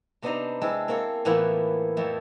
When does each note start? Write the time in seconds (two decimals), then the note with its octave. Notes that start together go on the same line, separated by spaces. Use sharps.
0.22 C3 B3 D4 D#4 C5 A#5
0.62 G#3 C4 E4 A4
0.88 A#3 C4 A4 C#5
1.25 A2 E3 F3 A#3 B3 F#5
1.97 F2 F3 A3